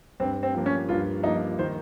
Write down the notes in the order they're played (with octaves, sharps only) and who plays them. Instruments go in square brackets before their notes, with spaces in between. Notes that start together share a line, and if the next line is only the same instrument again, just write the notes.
[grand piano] G2 [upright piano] C4
[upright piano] C4
[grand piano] F3 A#3
[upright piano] C#4
[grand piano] G2 [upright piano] F4
[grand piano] F3 A#3 [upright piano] D#4
[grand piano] D#3 [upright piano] C5